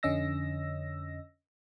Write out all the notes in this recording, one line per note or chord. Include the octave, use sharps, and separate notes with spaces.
F2 D3 C#4 D#5 E6 A#6